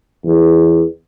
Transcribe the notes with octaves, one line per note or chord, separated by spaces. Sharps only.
E2